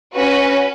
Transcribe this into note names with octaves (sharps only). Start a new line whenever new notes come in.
C#4 F#4 B4